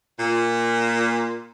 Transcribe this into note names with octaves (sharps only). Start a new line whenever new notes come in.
A#2